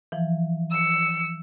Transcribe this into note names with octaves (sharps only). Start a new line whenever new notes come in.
E3 F3
E6 C#7